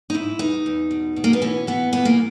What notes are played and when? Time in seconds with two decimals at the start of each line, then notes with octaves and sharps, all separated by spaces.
0.10 D#4
0.14 G#2 E4
0.39 E2 D#4
0.66 E2
0.91 B2
1.16 B2
1.24 A#3
1.33 B3
1.42 E3 C#4
1.67 E3 B3
1.93 A#2 B3
2.05 A#3